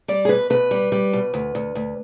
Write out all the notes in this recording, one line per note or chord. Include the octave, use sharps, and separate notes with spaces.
G3 D5
G#4
B2 B4
B2 B4
G3
G3
B2
D2
D2
D2